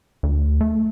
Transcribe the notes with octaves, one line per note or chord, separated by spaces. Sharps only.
D2
A3